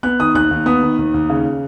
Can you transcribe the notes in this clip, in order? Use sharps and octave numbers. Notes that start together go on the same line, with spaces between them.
B3 F#6
D#3 D#6
D#2 F#6
D#2
B3 D#6
D#3
D#2
D#2
C#3